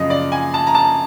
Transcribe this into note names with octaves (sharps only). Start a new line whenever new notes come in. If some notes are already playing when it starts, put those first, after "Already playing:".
Already playing: F#2 C#3 F3 D#5
D5
G#5
A5
A#5
A5